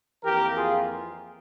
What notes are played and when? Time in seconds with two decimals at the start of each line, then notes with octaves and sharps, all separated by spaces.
0.24 F2 E3 A#3 G4 A#4
0.55 F4 G#4